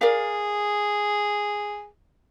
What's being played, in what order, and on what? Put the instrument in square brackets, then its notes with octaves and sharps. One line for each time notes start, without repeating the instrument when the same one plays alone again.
[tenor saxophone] G#4 [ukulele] A#4 D5 F5